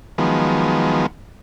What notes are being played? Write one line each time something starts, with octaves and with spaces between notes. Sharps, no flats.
D#3 F3 F#3 G#3 B3